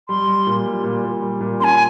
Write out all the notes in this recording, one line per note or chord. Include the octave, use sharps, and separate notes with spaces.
G3 C6
G3
A#2
G3
A#2
A#2
G3
A#2
C#4 G#5 C6